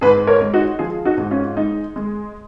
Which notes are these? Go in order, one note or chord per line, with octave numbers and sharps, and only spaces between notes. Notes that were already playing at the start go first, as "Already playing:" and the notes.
G#2 G#4 B4
A#4 C#5
G#3
D#4 F#4
F3 F4 G#4
D#4 F#4
G#2
C#4 F4
G#3 D#4
G#3